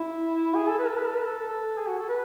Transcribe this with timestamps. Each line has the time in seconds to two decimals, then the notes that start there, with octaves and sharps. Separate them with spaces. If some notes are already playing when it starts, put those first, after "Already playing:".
Already playing: E4
0.55 G#4
0.69 A4
0.79 B4
0.88 A4
0.97 B4
1.06 A4
1.16 B4
1.25 A4
1.47 A4
1.78 G#4
1.88 F#4
1.99 A4
2.09 B4